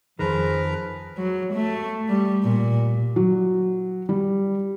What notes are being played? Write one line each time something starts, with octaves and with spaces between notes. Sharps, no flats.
F2 D#3 F3 G#4 A#4 B4 A#5
F#3
A3
G3
A#2
F#3
G3